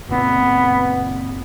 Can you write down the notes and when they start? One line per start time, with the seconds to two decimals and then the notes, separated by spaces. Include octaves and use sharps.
0.09 F#1 A#2 B3 C4